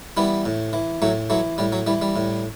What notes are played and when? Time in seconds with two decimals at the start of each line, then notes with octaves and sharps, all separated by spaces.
0.17 E3 G3 B3
0.45 A2
0.73 E3
1.02 A2 F#3 A3
1.30 E3 F#3 A3
1.58 A2 G3
1.72 F#3
1.87 E3 G3
2.02 G3
2.16 A2